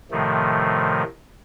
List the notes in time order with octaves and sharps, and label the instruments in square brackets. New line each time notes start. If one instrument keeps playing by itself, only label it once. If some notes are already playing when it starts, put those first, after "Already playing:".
[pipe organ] A2 C3 D#3 F3 A3